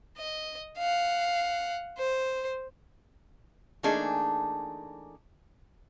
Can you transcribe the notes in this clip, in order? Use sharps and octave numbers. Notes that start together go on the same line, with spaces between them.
D#5
F5 F#5
C5
E3 A3 A#3 D4 D#4 G#4